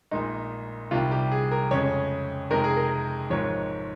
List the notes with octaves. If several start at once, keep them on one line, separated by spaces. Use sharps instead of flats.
A#1 A#2 G#3 D#4
C2 C3 D#3 G3 F4
G4
G#4
A#4
F2 C#3 G#3 C#5
F2 C3 D#3 G#3 A#4
G#4
A#4
G#1 G#2 F3 C#5